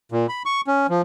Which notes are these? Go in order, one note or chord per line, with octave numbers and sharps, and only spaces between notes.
A#2
B5
C#6
C#4
F3